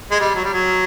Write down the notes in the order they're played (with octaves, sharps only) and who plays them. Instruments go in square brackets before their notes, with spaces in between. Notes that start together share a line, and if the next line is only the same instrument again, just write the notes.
[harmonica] G#3
G3
F#3
G3
F#3